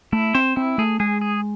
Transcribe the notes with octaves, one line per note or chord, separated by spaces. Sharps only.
A3 E4
C4 C5
C4 E4
A3 G#4
G#3 G#4
G#4